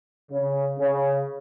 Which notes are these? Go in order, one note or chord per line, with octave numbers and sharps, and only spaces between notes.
C#3
C#3